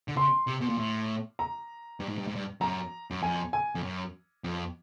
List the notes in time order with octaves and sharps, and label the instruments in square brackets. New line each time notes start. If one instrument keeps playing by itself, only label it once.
[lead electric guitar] D3
[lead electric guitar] C#3 [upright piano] C6
[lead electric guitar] C3
B2
A#2
A2
[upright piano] A#5
[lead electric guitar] G2
G#2
G2
G#2
G2
[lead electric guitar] F#2 [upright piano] A#5
[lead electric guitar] F#2
[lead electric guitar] F2 [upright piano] G#5
[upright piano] G#5
[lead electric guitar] F2
F#2
F2